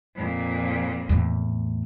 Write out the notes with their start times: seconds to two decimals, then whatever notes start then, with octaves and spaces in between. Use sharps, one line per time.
0.16 F2 A#2
1.09 E2 A2